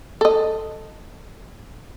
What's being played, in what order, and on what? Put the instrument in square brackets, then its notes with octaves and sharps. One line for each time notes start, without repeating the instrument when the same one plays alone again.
[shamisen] A4 D#5